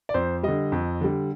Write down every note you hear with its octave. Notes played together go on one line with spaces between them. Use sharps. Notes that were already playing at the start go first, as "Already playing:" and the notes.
D5
F2 C5
D3 G3 D#5
F2
D3 G3